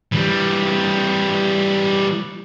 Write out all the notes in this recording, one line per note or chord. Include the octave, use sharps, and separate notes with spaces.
E3 G3